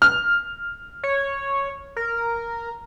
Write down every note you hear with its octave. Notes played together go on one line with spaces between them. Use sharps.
F6
C#5
A#4